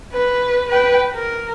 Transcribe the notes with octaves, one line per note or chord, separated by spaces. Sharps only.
B4
B4 G5
A#4